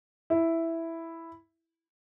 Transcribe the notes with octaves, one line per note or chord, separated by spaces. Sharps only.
E4